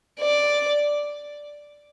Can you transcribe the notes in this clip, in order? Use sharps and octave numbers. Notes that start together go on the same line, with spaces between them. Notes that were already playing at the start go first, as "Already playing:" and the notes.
D5